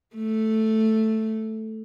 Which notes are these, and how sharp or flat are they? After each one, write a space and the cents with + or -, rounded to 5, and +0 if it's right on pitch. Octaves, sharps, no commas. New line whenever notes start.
A3 +0